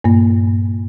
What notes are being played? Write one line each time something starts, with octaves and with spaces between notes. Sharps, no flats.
G2 A#2 A#3